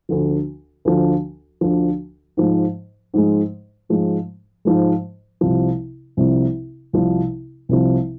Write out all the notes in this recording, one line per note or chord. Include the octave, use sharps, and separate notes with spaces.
D2 D3 F3
D2 D3 F3
D2 D3 F3
G#2 F3 G#3
G#2 F3 G#3
G#2 F3 G#3
G#2 F3 G#3
C2 C3 F3
C2 C3 F3
C2 C3 F3
C2 C3 F3